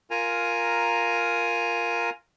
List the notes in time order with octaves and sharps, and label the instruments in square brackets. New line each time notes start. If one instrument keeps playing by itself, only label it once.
[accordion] F4 A#4 G#5 A#5